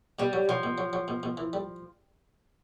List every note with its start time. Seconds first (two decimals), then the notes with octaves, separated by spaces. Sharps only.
0.19 B2 G3
0.33 F#3
0.49 F3 F#3
0.63 B2
0.78 F#3
0.93 F#3
1.08 B2
1.23 B2
1.37 E3
1.53 G3